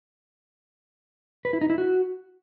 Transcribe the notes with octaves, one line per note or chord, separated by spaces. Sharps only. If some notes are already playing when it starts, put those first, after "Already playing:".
B4
E4
D#4
E4
F#4